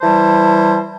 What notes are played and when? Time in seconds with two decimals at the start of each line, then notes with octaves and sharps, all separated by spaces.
0.02 E3 G3 C5 A5